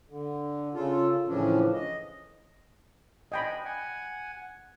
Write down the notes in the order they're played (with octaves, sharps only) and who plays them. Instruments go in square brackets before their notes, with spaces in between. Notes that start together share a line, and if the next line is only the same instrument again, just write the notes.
[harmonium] D3
C#3 F4 A4
A2 C#3 E3 F3 C#4 D4
D#5
[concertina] D4 G#5 [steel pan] D#5 G5 B5
[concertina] F#5 G#5